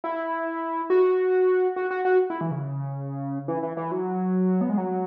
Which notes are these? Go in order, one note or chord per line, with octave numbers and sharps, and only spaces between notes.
E4
F#4
F#4
F#4
F#4
E4
E3
C#3
E3
E3
E3
F#3
B3
G#3
F#3